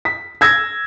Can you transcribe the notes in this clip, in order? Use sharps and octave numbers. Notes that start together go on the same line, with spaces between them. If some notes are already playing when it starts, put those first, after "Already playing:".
B6
E6 G#6 A#6